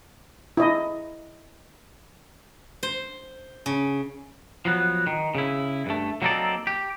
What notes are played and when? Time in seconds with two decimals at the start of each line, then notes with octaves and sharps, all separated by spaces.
0.57 E4 D#5
2.83 C5
3.66 C#3
4.65 F3 F#3 B3
5.07 D#3
5.35 C#3 E4
5.86 G2 A3
6.22 F#3 A#3 C4 D#4 A4 D5
6.67 G4